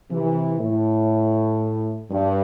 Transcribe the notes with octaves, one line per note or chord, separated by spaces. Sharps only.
C3 E3
A2
G2